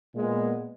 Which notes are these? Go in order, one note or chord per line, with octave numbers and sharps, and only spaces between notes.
A#2 G#3 B3